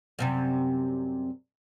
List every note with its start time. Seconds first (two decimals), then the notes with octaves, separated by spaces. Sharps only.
0.19 F#2 C3 G3